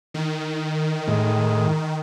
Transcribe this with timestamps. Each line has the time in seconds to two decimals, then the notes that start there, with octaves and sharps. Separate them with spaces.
0.14 D#3
1.08 A2 G#3